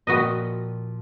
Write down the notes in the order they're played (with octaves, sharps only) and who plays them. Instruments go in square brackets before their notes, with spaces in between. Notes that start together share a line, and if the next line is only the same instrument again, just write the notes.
[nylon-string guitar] A#2 F3 G5 [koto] F#4 B4 D#5